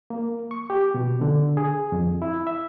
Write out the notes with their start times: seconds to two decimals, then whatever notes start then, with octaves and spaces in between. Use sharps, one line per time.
0.10 A#3
0.51 C#6
0.70 G4
0.94 B2
1.21 D3
1.57 G#4
1.92 F2
2.22 E4
2.47 E5